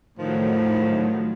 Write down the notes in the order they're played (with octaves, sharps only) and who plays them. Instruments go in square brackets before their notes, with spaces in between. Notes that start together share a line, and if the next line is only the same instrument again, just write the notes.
[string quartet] A2 [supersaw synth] D#3 F#3 [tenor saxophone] F3